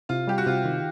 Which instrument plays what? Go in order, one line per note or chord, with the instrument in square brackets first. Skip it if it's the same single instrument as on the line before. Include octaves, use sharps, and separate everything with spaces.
[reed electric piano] C3 [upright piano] F4
[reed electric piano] G3 [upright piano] G4
[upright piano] F#4
[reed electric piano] C3 [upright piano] F4
[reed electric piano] D#3